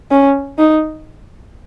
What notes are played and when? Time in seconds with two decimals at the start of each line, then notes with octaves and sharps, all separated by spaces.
0.11 C#4
0.58 D#4